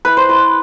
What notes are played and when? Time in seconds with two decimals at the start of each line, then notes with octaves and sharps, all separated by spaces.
0.05 E4 B4
0.17 C5
0.29 E4 B4